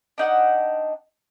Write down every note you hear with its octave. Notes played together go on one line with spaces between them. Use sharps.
D4 D#4 F#5 G5